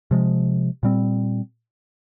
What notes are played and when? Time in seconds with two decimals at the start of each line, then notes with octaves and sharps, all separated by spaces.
0.11 C3 F3 G#3
0.83 A#2 G3 C4